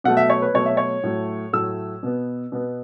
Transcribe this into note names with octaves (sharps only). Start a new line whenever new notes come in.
B2 F#3 A3 F#5
E5
C#5
B4
B2 F#3 A3 C#5
E5
C#5
A2 F#3 A3
A2 F#3 A3 E6
B2 B3
B2 B3